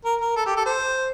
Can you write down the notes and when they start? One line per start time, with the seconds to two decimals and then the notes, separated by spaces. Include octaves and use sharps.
0.05 A#4
0.21 A#4
0.36 A4
0.46 G4
0.57 A4
0.66 C5